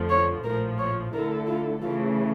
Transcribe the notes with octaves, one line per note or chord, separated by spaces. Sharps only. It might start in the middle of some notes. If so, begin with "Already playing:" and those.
Already playing: F2 D3 F3 A3
C#5
A#1 A2 F3 A#4
C#5
D3 A3 E4 A4 A#4
F4
C#3 E3 A3 F4